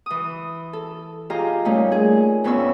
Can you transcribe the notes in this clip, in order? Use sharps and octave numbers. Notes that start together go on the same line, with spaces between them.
E3 D#6
A4
F4 G4 G#4 D#5 F5 A#5
A#2 G3 A3 C#4 D#4
G#4
F2 B3 C#4 D4 C#6 E6